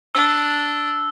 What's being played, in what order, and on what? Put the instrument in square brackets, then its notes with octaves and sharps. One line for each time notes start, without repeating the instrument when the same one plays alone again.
[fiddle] D4 [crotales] E6